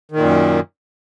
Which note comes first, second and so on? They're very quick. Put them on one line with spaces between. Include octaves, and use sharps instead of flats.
D#3 A#2 F#2